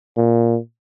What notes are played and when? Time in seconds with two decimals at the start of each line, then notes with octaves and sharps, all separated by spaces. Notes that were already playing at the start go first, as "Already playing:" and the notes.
0.17 A#2